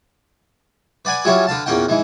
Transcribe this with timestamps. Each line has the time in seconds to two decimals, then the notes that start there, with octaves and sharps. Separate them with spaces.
1.05 B4 D5 F#5 G#5 B5
1.25 F#3 G3 C#4 E4 F4 G#4
1.47 D3 B4 F5 A5
1.66 E2 A#2 C#4 A#4 F#5 G5
1.89 G#2 E3 G#3